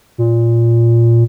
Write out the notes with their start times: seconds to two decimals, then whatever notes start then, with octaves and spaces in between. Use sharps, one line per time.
0.18 A#2